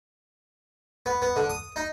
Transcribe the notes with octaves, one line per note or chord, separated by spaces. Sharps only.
B3
B3
D3
D#6
D#4